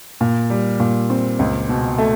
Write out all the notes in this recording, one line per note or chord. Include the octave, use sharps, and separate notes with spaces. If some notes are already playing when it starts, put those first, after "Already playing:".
A#2
G3
A#2
C4
C#2
B2
A3